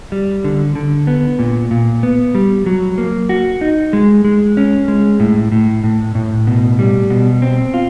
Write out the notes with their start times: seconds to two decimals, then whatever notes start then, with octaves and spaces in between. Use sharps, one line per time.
0.12 G3
0.44 D3
0.75 D3
1.07 B3
1.39 A#2
1.71 A#2
2.03 B3
2.35 G3
2.66 F#3
2.98 A#3
3.29 F#4
3.61 D#4
3.93 G#3
4.25 G#3
4.57 C#4
4.88 G#3
5.20 A2
5.52 A2
5.84 A2
6.15 A2
6.47 B2
6.79 G3
7.10 B2
7.42 C4
7.74 F4